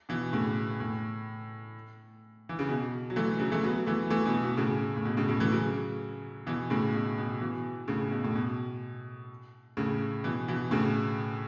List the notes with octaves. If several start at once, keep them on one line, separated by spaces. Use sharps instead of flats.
B2 E3
A2 C#3
A2
E3
C#3
B2
F#3
E3 A3
C#3 F#3
E3 A3
F#3 B3
E3 A3
E3 A3
B2
B2
A2 C#3
A2
B2
A2 C#3
A2 C#3
E3 A3
C#3 F#3
B2 E3
A2 C#3
B2
B2
B2 E3
A2 C#3
B2
A2
B2
A2 C#3
B2 E3
B2 E3
A2 C#3